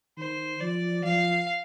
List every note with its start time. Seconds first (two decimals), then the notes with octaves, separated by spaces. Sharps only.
0.17 D#3 C5
0.60 F3 D5
1.04 F3 F5